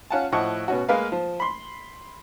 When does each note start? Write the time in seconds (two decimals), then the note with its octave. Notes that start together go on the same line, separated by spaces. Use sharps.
0.10 C#4 F4 F#5 G#5 A5
0.32 A2 F3 D#5 F#5 C#6
0.68 B2 C#4 F#4
0.89 G#3 A#3 B4 F5
1.12 F3
1.40 B5 C6